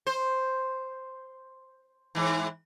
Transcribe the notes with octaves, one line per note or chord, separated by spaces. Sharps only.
C5
G#2 E3